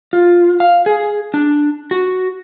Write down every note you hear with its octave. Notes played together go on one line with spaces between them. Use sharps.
F4
F5
G#4
D4
F#4